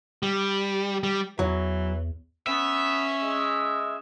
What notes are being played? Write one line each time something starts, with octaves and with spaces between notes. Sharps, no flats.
G3
G3
E2 E3 F#3
B3 C#4 E5
G#3